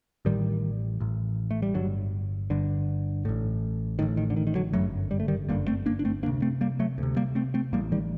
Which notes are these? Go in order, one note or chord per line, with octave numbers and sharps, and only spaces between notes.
A1 A2 D#3 G3
A1 A2
A3
G3
G1 G2 D3 F#3
G1 G2 D3
A1 A2
A1 A2 D#3
D#3
D3
D#3
D#3
D3 F#3
G1 F#2 D3 F#3 A3
G3
A3
D#3 G3
G1 F#2 D3 G3 A#3
A3 C4
A#3 D4
D4
A3 C4
D2 C3 A#3 D4
A3 C4
G3 A#3
F#3 A3
D2 C3
G3 A#3
A3 C4
A3 C4
A1 A2 G3 A#3
D#3 G3